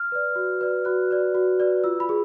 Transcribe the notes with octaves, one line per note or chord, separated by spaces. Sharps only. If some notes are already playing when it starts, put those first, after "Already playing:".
Already playing: F6
B4 D5
F#4
B4 D5
F#4 F#6
B4 D5
F#4
B4 D5
F4 E6
B5
G#4